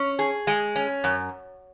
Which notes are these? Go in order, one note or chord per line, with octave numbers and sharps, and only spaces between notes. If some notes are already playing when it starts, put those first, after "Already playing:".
Already playing: C#4
G#4
G#3
C#4
F#2